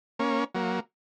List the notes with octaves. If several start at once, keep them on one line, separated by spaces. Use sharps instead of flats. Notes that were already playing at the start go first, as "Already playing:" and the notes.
A#3 C#4
F#3 A#3